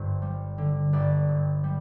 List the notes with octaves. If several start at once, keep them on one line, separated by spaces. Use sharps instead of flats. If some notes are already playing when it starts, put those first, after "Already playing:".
Already playing: G1 G2 C5
G3
D3
G1 D5
G2
G3